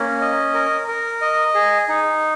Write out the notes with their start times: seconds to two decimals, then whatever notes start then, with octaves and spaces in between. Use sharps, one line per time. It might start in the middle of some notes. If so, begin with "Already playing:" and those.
Already playing: A#3 C#4
0.21 D#5
0.54 A#4
0.88 A#4
1.22 D#5
1.54 G#4
1.89 D#4